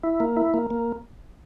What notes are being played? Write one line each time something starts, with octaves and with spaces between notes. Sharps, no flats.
E4
A#3
E4
A#3
A#3